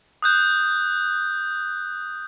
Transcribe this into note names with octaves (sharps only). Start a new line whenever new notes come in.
D#6 F#6 G6